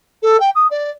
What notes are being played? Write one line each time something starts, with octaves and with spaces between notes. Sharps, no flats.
A4
G5
D#6
D5